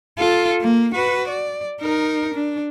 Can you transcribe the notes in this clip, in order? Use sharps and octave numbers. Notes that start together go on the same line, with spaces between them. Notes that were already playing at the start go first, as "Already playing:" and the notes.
F4 A4
A#3
F#4 B4
D5
D#4 A#4
D4